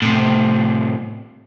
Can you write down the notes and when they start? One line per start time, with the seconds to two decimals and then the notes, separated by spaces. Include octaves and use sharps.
0.02 A2 C3